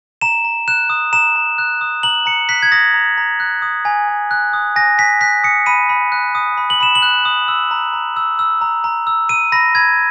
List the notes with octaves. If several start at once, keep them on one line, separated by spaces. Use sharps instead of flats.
A#5 E7
A#5
F#6 E7
D#6
A#5 E7
A#5
F#6
D#6
A#5 F#7
A#5 C#7
F#6 B6
G#6
D#6 A#6
A#5
A#5
F#6
D#6
G#5
G#5
F#6
D#6
G#5 A#6
G#5 B6
F#6 B6
D#6 C#7
B5 D#7
B5
F#6
D#6
B5
F#7
B5 E7
F#7
F#6
D#6
E6
A#5
A#5
E6
E6
A#5
A#5
E6
E6 D#7
B5 A#6
B5 G#6